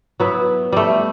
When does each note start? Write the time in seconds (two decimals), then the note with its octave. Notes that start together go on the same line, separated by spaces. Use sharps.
0.20 F#3 B3 E4
0.72 G3 A3